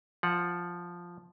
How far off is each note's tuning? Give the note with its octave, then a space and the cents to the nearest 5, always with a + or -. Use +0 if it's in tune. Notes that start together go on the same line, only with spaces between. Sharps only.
F3 +0 F#5 -15